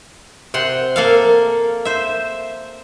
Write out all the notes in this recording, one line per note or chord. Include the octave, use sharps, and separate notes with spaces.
C3 F#5 C6
A#3 A4 F5
C5 E5